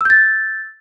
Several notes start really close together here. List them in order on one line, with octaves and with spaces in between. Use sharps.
E6 G6 A6